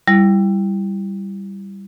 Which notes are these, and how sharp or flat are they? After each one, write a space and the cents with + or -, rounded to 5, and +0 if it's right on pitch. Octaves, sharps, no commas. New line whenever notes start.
G3 +0 E4 +20